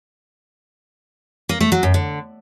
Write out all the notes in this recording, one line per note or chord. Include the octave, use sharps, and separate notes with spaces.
A#3
A3
F#3
F#2
D3